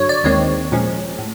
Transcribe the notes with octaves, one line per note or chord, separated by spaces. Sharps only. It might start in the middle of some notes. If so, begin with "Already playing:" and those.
Already playing: G2 D3 F#3 C#5
D5
D#2 D#3 G#3 C4 C#5
A#2 F3 G#3 C#4
A2